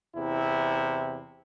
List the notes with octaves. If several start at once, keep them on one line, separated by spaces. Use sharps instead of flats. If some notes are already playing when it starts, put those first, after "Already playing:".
E2 C3 E4